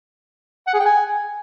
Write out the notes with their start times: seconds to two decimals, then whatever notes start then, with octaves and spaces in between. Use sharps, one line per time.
0.68 F#5
0.74 G#4
0.80 G5
0.86 G#5